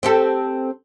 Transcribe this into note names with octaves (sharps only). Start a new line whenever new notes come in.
C4 G4 A4